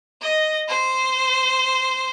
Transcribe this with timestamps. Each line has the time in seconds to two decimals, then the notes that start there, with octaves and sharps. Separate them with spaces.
0.22 D#5
0.68 C5